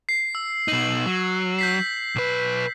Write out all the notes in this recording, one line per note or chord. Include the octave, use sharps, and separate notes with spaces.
C7
E6
B2 D#4 F#7
F#3
G6 B6 C7
B1 B4